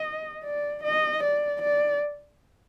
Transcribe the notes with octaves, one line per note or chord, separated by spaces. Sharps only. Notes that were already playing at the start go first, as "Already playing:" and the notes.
Already playing: D#5
D5
D#5
D5
D5